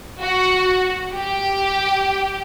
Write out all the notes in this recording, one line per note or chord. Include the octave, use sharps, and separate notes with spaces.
F#4
G4